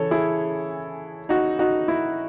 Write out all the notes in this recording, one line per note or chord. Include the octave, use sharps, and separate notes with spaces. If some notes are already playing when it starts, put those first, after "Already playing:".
Already playing: C#3 E3 A4 C#5
E4 G#4
D#4 F#4
D#4 F#4
E4